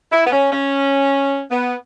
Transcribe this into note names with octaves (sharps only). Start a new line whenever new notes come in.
E4
B3
C#4
C#4
B3